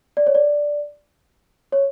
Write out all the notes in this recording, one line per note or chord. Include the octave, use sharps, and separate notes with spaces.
D5
C#5
D5
C#5